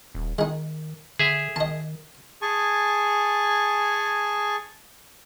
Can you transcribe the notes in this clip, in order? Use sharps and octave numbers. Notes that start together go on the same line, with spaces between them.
D#1
D#3 G#3 D#4
D3 G#4 E5
D#3 D#5 A5
G#4 G#5 A5 C#6